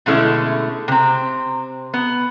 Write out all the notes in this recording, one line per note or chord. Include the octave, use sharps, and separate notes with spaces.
B2 D3 G#3 A3 C#4 E4
C3 C4
B3